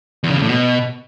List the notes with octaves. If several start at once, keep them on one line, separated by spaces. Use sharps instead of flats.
E2
C#3
E2
A2
B2